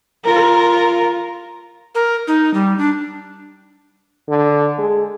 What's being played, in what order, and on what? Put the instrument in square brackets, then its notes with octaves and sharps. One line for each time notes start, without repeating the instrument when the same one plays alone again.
[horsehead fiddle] F4 A#4
[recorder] A#4
D#4
G3
D4
[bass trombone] D3
G#3